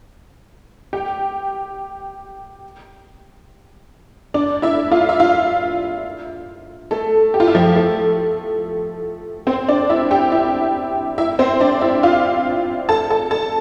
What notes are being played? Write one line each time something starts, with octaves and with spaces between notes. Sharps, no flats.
G4 G5
D4 D5
E4 E5
F4 F5
E5
F4 F5
A3 A4
G4
F4
E4
F3 F4
A3 A4
C4 C5
D4 D5
E4 E5
G4 G5
E4 E5
E4 E5
C4 C5
D4 D5
E4 E5
F4 F5
A4 A5
A4 A5
A4 A5